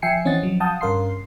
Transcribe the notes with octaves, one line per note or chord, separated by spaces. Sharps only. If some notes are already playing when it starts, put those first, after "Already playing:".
F3 E5 G5 G#5 C7 C#7
E3 C4 C#4 D#5 F#5 A6
F3 F#3
F5 F#5 A5 D#6 G6
G2 C#4 A#4 F5 C6 C7